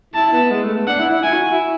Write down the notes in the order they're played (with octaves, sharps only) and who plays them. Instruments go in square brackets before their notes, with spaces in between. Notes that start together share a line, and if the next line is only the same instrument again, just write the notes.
[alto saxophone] E4 [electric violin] A5
[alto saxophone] B3
G#3
A3
B3
[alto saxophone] D4 [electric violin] F#5
[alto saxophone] E4
E4
[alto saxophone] E4 [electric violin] G#5
[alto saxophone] F#4
E4